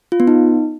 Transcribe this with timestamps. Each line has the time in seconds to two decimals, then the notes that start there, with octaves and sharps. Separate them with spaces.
0.12 F4
0.20 B3
0.27 D#4